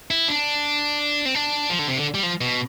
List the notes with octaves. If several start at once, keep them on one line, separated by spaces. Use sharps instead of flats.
E4
D4
C4
D4
F3
D3
C3
D3
G3
F3
B2